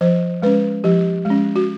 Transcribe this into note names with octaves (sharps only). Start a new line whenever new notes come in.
F3 C5
G#3 C#4 B4
F3 G4
G#3
C#4
F#4